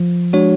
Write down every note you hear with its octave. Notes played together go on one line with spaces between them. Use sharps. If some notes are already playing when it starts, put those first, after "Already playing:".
Already playing: F3
G#3 D4 F#4 C#5